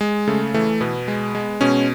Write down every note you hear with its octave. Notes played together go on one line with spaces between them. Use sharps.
G#3
C#3 A3
E3 A3
B2 B3
G#3
G#3
B2 C#4